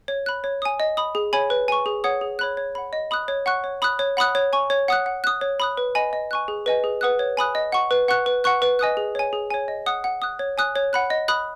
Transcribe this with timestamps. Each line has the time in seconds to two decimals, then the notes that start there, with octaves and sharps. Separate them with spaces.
0.08 C#5
0.26 B5 F#6
0.44 C#5
0.62 G#5 D#6
0.80 D#5
0.97 B5 D#6
1.15 G#4
1.33 C#5 G#5 B5
1.50 B4
1.68 G#5 C#6
1.86 G#4
2.04 C#5 F#5 D#6
2.21 G#4
2.39 C#5 B5 F#6
2.57 C#5
2.75 F#5 B5
2.93 D#5
3.11 B5 D#6 F#6
3.28 C#5
3.46 F#5 C#6 F#6
3.64 C#5
3.82 B5 D#6 F#6
3.99 C#5
4.17 F#5 B5 D#6 F#6
4.35 C#5
4.53 G#5 C#6
4.70 C#5
4.88 F#5 D#6 F#6
5.06 F#5
5.24 D#6 F#6
5.41 C#5
5.60 B5 D#6 F#6
5.77 B4
5.95 D#5 G#5 B5
6.13 D#5
6.31 G#5 C#6 F#6
6.48 G#4
6.66 B4 D#5 G#5
6.84 G#4
7.01 B4 F#5 D#6 F#6
7.19 C#5
7.37 G#5 B5 D#6 F#6
7.55 D#5
7.72 F#5 C#6
7.91 B4
8.08 F#5 C#6 F#6
8.26 B4
8.44 F#5 C#6 F#6
8.62 B4
8.79 D#5 G#5 D#6 F#6
8.97 G#4
9.15 C#5 G#5
9.33 G#4
9.50 C#5 G#5
9.68 D#5
9.86 F#5 D#6 F#6
10.04 F#5
10.22 D#6 F#6
10.39 C#5
10.58 G#5 D#6 F#6
10.76 C#5
10.93 F#5 B5 F#6
11.10 D#5
11.28 B5 D#6 F#6